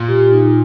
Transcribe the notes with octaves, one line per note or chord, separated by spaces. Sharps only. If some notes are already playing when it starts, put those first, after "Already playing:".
Already playing: A#2
G4
D#4